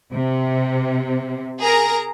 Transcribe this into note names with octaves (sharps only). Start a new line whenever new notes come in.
C3
G#4 A#4 A#5